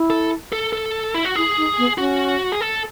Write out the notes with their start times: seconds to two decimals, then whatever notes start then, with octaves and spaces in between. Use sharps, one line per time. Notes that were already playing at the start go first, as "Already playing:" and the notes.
Already playing: E4
0.10 A4
0.52 A4
0.73 A4
1.14 E4
1.25 F#4
1.36 E4 G#4
1.57 D#4
1.78 B3
1.97 C#4 F#4
2.52 G#4
2.61 A4